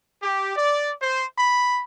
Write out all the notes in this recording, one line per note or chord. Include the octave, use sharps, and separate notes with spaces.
G4
D5
C5
B5